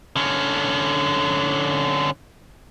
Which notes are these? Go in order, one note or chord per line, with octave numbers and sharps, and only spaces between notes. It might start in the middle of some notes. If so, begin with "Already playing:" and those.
D3 C#4